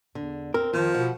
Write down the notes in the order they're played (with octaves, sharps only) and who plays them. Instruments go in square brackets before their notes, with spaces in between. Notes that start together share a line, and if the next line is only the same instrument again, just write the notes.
[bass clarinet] E2 [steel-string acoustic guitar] D3
[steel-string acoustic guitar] C4 [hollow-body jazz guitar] A#4
[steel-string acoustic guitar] F2 [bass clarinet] D#3 [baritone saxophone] F3
[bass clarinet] B2 [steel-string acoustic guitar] F#5